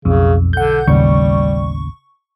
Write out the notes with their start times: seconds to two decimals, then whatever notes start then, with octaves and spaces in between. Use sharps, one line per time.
0.05 B1 F2 C#3
0.53 D3 F#5 G6
0.88 A1 D#2 C#3 G3 C#6